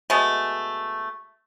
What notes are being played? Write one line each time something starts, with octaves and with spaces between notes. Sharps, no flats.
B2 G#3 A3